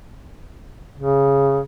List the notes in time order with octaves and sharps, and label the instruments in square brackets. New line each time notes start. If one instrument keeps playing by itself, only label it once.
[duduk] C#3